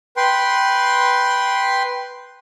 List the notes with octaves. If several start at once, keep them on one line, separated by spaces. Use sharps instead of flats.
B4 G5 C6